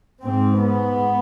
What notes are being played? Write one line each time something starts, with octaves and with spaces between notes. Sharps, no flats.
G#2 C4
B3